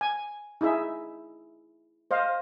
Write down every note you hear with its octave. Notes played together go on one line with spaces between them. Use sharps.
G#5
D#4 E4 G#4 E5
C5 D#5 F5